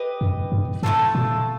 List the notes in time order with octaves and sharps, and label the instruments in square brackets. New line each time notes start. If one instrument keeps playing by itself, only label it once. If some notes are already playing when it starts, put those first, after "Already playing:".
Already playing: [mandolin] G4 B4 D#5
[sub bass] F#2
G2
[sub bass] G#2 [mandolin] A3 C#4 F4 A4
[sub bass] A#2